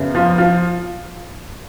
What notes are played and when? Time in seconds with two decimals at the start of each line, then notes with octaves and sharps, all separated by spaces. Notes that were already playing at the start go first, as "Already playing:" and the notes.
Already playing: F#2 C#3 B3
0.15 F3 F4
0.38 F3 F4